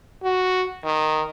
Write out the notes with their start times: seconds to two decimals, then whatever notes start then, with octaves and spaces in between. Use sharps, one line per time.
0.24 F#4
0.85 D#3